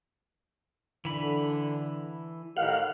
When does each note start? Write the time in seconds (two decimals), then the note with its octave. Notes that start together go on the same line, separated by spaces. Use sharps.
1.05 D3 E3 B5
2.57 A2 D#3 G4 F5 F#5